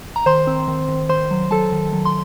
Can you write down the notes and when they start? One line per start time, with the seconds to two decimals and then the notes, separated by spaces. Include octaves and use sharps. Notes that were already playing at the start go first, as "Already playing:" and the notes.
0.16 A#5
0.26 D#3 C5 C6
0.47 C4
0.68 D#3
0.89 D#3
1.09 D#3 C5 C6
1.31 F#3
1.51 F#3 A4 A5
1.72 D#3
1.93 F#3
2.05 C6